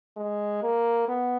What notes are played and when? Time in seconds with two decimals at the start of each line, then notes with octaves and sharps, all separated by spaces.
0.17 G#3
0.62 A#3
1.08 B3